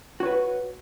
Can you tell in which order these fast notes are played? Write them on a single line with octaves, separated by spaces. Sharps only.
F#4 C#5 B4